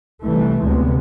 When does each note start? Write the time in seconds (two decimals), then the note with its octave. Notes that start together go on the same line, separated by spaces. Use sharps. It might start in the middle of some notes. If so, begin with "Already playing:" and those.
0.24 C2 E3 A3
0.63 D2 C3 G#3 B3